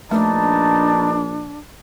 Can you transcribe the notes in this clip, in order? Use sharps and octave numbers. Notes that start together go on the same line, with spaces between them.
A#1 A3 D4 D#4 B4 A5